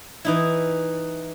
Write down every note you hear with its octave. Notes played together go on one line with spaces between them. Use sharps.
E3 D#4 E4